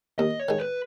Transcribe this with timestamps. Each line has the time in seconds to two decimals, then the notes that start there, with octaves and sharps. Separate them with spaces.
0.18 D#2 D#5
0.39 C#5
0.49 D#3 G#3
0.59 B4